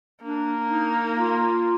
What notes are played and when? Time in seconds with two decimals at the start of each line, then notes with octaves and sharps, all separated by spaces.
0.22 A#3 D4
0.70 D#4
1.16 F4